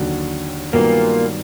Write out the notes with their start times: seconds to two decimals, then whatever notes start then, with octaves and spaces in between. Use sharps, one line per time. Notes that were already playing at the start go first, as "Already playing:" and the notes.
Already playing: D#2 D3 F#3
0.73 G2 A#2 D#3 F#3 A#3 B3